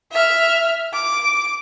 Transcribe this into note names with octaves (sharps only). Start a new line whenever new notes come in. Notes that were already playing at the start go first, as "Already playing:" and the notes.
E5 F6
D6